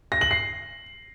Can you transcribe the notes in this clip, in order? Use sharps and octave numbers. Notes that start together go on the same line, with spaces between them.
A#6
F#7
C7